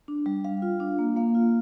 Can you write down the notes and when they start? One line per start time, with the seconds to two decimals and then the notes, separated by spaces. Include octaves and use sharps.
0.08 D4
0.26 G3
0.44 G3 F5
0.62 F4
0.80 D4
0.99 A#3
1.16 A#3 F5
1.35 F4